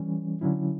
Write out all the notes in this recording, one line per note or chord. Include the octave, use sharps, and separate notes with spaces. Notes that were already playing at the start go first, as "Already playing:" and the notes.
Already playing: E3 G3 C#4
D3 F#3 C#4 E4